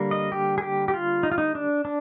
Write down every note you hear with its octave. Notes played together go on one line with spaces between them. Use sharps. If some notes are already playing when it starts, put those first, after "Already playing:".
Already playing: D3 G3 A#3
D#5
G4
G#4
G4
G4
F4
D#4
F4
D#4
D4
D4